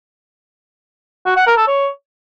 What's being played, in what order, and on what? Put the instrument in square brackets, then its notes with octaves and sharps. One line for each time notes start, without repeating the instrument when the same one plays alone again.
[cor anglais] F#4
F#5
A#4
A4
C#5